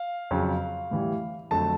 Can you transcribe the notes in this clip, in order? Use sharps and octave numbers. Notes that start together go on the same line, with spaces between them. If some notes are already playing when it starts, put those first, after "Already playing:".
Already playing: F5
F2 C#3 F#3
A2 E3 G3
F2 D3 F#3 A3 A5